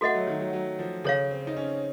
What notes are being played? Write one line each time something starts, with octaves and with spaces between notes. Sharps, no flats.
A3 F#4 A4 D#5 F#5
F#3
D#3
F#3
F#3
F3
C#3 A4 C#5 F5
C4
D#4
C#4